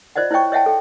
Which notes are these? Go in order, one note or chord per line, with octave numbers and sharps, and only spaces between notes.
F4 C5 D5 D#5 F#5
E4 C5 C#5 D#5 G5 C#6
C#5 D#5 E5 F#5 G5 A5
A4 G5